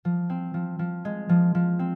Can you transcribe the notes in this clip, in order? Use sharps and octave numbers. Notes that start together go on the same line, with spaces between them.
F3
C4
F3
F3
G#3
F3
F3
C4